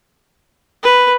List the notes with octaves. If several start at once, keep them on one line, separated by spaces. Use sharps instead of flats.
B4